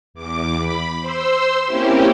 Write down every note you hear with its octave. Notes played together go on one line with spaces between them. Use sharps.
E2 D6
B5
C5 C6 E6
A#3 C4 C#4 E4 G4